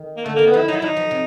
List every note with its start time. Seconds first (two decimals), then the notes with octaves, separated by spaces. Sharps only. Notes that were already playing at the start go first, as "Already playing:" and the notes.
Already playing: D#3
0.17 A#3
0.25 D3 A3
0.36 A#3
0.39 D#3
0.47 B3
0.53 F3 E4
0.68 F#3 D#4
0.76 E4
0.82 F#3 D#4
0.96 F3
1.11 C3